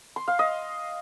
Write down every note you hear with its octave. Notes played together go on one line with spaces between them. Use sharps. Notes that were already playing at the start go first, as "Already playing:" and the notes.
C6
F5
D#5